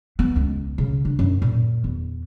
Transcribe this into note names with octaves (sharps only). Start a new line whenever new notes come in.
B3
C#2
C#3
D4
F#2
A#2
E2